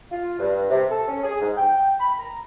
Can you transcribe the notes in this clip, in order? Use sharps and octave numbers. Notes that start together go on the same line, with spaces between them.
F4
G2
C3
A4
C#4
G#4
G#2
G5
B5
A#5